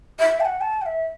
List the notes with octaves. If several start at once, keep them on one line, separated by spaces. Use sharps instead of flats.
E5
A5
F#5
A5
F#5
E5